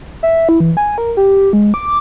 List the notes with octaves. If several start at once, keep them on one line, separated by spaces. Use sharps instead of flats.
E5
E4
E3
G#5
A#4
G4
G#3
D6